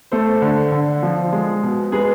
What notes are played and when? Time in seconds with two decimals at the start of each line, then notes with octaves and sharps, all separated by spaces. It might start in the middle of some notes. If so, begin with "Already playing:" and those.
0.12 A3 A4 C5
0.42 D3
0.72 D3
1.03 F3
1.33 G#3
1.63 B2
1.92 G#3 G#4 B4